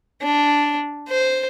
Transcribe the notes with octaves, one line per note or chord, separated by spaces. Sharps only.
D4
C5